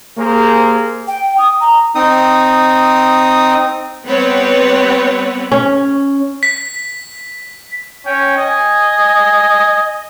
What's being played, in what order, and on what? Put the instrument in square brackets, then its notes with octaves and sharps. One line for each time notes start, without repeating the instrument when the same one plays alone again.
[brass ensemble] A#3 G4 G#4 A#4 C5
[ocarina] G5
D#6
A#5
[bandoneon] C4 D#4 D#6
[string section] G3 B3 C4 B4 C#5
[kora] C#4
[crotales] B6
[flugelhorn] C#4 [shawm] G5
[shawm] D#5 [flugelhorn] G#5